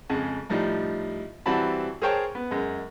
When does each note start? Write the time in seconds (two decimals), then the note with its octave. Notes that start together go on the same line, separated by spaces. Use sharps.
0.09 F2 C#3 G#3
0.50 A2 F3 G3 D#4
1.46 E3 G3 C4 F#4 A5 B5
2.02 G#4 A#4 C5 C#5 G5 A5
2.35 B3
2.51 F#2 G#3